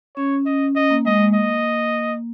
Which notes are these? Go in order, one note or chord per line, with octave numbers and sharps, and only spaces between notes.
C#4 C#5
C#4 D#5
C#4 D#5
A#3
G#3 D#5
G#3
A#3
D#5